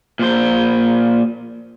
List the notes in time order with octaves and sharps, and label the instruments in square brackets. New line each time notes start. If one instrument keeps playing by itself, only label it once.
[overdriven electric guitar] A#2 C5